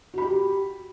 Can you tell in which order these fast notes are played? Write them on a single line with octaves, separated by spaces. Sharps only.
F#4 B5 G4